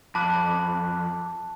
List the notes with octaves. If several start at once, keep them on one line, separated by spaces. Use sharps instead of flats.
F2 A5 B5 D6 F#6